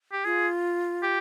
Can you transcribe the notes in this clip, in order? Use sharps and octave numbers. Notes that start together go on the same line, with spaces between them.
G4
F4 G#4
G4